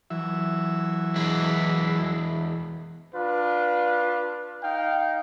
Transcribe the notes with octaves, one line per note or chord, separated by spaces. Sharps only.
E3 F#3 E5
E2 G#3 E4
D4 F4 B4
D#4 F5 G5